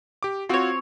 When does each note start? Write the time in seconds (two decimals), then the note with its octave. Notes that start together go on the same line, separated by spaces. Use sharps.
0.23 G4 D6
0.49 C4 F4 F#4 C#5